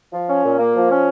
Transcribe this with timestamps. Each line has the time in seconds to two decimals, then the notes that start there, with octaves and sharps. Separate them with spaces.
0.13 F3
0.28 C#4
0.43 A#2
0.59 A#3
0.74 F3
0.90 C#4